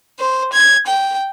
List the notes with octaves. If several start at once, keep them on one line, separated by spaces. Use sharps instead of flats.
C5
G#6
G5